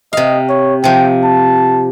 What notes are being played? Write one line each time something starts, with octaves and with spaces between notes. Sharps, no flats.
C3 D#5 F5
C#5
C3 F3 G5
A5